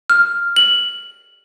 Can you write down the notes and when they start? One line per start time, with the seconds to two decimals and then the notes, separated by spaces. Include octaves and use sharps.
0.10 F6
0.56 F#7